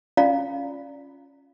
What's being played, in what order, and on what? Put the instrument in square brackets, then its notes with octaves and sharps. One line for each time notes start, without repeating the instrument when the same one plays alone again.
[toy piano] C#4 F4 D5 F5 A#5